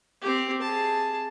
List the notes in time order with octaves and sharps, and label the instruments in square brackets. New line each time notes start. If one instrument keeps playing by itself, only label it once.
[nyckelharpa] C4 G4
G#4 A5